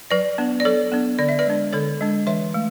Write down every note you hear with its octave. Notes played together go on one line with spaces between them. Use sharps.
F#3 B4 D5
B3 D4
D5
F#3 A4 C#5
B3 D4
D3 D5
E5
B4 D5
G#3 D4
D3 A4 C#5
G#3 D4
E3 C#5 E5
A3